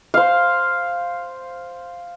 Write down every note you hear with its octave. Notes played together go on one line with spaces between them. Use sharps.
C5 F5